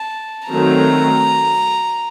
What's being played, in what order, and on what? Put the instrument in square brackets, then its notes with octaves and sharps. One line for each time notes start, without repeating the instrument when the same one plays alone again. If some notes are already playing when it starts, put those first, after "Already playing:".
Already playing: [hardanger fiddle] A5
[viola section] D#3 F#3 A3 C4 [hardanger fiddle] A#5